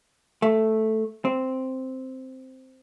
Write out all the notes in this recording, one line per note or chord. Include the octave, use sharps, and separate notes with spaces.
A3
C4